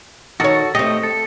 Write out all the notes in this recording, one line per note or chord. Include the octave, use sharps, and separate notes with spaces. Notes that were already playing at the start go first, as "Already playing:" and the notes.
D#3 F#4 A4 C#5
A3 C4 G4 D#5
A4